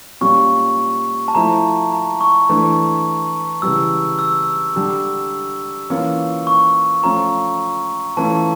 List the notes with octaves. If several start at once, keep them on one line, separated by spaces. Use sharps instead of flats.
A#2 G3 C#4 F4 C#6
A5
F3 A3 E4 A#5
A#5
C#6
E3 A3 D4
C#3 E3 G3 E6
E6
D3 G3 D4
E3 A#3 C#4 F4
C#6
F3 A3 C#4 F4 A#5
E3 A3 C#4 F4 A5